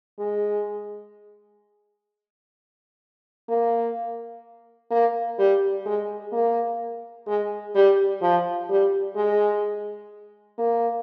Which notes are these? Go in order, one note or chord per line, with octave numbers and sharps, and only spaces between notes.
G#3
A#3
A#3
G3
G#3
A#3
G#3
G3
F3
G3
G#3
A#3